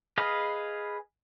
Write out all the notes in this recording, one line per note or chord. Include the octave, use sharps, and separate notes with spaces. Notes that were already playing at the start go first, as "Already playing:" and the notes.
G#4 B4 D#5 F5